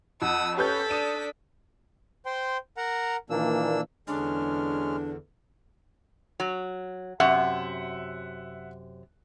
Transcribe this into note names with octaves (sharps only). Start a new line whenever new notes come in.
F2 F#5 D#6 E6
C#4 G4 A4 B4 G6 B6
D4 D#6 D#7 E7
C5 G5 C6
A#4 F#5 A#5
A#2 D#3 E3 A#3 D4 E6
E2 D3 G#3 C#4 D4 F6
F#3
F#2 C3 E5 F#5